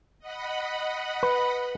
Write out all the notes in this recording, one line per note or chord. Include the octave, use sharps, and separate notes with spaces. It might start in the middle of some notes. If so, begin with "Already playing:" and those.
D#5 F#5 B5
B4